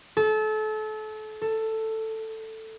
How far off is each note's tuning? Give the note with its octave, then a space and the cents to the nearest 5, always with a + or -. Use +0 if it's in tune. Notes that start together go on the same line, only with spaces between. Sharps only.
A4 -30
A4 +10